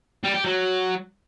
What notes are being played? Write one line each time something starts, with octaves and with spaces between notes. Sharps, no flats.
G3
G4
F#3